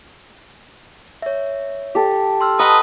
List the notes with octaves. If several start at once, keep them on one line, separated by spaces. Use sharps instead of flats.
C#5 E5
G4 A4
C6 E6 F6
B4 D#5 F#5 A5 A#5 D#6